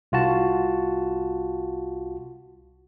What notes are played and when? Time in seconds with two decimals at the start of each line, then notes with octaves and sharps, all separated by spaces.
0.12 C2 F4 F#4 A5